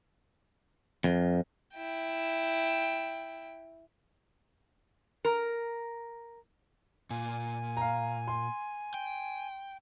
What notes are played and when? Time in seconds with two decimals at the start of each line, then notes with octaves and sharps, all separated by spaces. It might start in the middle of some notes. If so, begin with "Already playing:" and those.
1.04 F2
1.75 E4 G5
5.25 A#4
7.10 A#2 G#5
7.77 F5 A#5
8.28 C6
8.94 G5